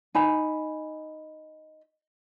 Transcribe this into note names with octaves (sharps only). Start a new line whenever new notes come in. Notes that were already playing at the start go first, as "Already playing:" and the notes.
D#4 G#5 B5